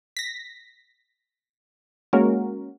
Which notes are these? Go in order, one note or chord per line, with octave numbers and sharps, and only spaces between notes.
A#6 B6
G#3 A#3 C#4 F#4 A#4